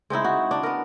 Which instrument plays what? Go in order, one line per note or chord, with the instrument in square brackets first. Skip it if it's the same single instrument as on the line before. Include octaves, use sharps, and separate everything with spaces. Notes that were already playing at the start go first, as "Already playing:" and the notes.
[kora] G#3 C4 D#4 E4
F#4
D4
B3 A#4